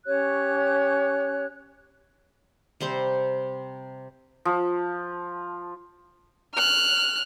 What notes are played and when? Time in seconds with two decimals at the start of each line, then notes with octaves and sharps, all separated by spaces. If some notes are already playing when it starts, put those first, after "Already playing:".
0.06 C#4 G4 C#5 F#6
2.80 C3 G3 C4 C5
4.45 F3
6.55 F6 F#6